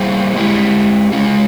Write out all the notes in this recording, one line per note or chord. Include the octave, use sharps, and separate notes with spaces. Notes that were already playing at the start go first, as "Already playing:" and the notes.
Already playing: G3 A#3 E4 G#4 C5
G#3 E4 G4
G#3 C#4 F4